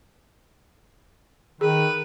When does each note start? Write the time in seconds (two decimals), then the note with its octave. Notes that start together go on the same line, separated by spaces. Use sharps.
1.61 D#3 G#4 B4